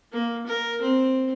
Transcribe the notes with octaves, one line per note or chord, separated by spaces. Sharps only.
A#3
A#4
C4